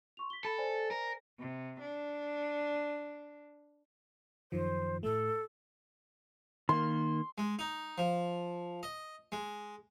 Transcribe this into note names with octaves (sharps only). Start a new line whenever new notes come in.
C6 C#6 F7
B6 G7
A4 B5
C5 D5 G#5
A#4
C3
D4
F#2 D#3 F3 C5
A2 A3 A4
D#3 A#3 C6
G#3
D#4
F3
D#5
G#3